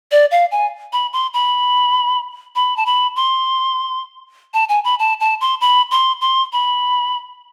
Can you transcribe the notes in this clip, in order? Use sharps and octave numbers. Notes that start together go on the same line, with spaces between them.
D5
F5
G#5
B5
C6
B5
B5
A5
B5
C6
A5
G#5
B5
A5
A5
C6
B5
C6
C6
B5